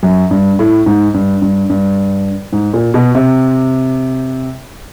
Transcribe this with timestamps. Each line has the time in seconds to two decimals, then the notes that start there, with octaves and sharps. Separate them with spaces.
0.03 F#2
0.31 G2
0.59 A2
0.86 G#2
1.14 G2
1.42 G2
1.70 G2
2.53 G#2
2.74 A#2
2.94 B2
3.15 C3